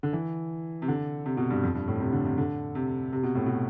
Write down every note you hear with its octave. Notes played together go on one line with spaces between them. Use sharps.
D3
E3
C3
D3
C3
B2
G2
F2
G2
A2
C3
D3
C3
D3
C3
C3
B2
A2
B2